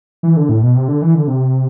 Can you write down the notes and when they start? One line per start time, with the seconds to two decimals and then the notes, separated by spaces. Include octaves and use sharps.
0.23 E3
0.37 D3
0.49 A2
0.63 B2
0.76 C3
0.88 D3
1.02 E3
1.15 D3
1.28 C3